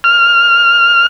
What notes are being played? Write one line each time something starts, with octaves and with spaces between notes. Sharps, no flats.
F6